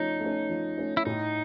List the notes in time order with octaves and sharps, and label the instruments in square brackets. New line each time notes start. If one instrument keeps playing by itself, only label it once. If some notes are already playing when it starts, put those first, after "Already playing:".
Already playing: [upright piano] F3 A3 C#4 [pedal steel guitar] D#4
[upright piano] A3 C#4
F3
A3 C#4
[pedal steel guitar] E4
[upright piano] A2 [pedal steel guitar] D#4